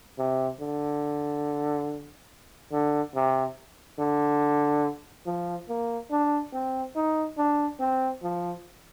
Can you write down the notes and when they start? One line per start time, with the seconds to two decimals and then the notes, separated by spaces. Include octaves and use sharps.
0.18 C3
0.60 D3
2.72 D3
3.15 C3
3.99 D3
5.26 F3
5.69 A#3
6.11 D4
6.53 C4
6.96 D#4
7.37 D4
7.80 C4
8.23 F3